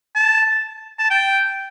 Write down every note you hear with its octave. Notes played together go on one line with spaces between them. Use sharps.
A5
A5
G5